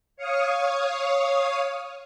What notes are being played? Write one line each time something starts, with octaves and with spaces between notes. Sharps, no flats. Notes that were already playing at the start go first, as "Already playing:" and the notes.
C#5 F5 C#6 D#6